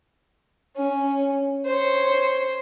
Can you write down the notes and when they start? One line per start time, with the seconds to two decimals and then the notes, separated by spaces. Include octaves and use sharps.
0.76 C#4
1.66 C5 C#5